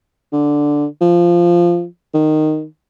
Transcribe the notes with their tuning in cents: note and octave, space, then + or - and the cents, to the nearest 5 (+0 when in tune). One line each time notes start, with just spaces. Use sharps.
D3 +0
F3 -10
D#3 -10